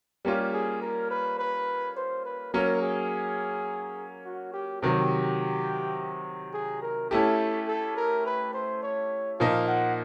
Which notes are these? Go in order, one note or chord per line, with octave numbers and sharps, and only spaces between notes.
G3 A#3 C#4 F4 G4
G#4
A#4
B4
B4
C5
B4
F#3 A#3 C#4 A#4
G#4
F#4
G4
C3 D#3 F#3 G4
G#4
A#4
A3 C#4 E4 G4 A4
A4
A#4
B4
C5
C#5
A#2 F3 A#3 D#4 F5
F#5